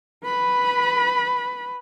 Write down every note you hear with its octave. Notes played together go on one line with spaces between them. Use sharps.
B4 B5